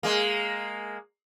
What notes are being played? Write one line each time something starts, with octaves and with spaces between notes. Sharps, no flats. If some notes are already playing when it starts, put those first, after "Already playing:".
G#3 A#3